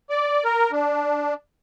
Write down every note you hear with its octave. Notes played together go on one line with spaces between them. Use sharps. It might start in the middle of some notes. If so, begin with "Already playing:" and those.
D5
A#4
D4